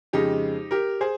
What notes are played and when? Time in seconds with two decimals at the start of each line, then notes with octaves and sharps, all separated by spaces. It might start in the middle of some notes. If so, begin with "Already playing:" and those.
0.13 F2 C#3 G#3 D#4 G4
0.71 G4 A#4
1.01 G#4 C5